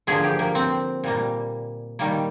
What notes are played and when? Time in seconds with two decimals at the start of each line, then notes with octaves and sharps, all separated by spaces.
0.07 D3 F3 A#3 G#4
0.24 G4
0.39 A#3
0.55 C4
1.04 A#2 G3 A#3
1.99 D#3 G3 A#3